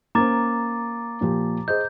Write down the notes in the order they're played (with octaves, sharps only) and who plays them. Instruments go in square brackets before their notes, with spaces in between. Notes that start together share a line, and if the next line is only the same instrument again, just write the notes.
[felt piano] A#3 C#4 C5 [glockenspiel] A#5 D6 A6
[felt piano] A#2 F3 G4
[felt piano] G#4 C5 D#5 [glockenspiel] G6